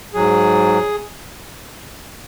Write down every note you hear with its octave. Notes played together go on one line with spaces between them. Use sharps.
G#2 F#3 G#4